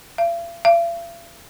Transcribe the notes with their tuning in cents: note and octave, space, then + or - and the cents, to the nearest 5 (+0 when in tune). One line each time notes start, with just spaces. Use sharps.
F5 -45
F5 -45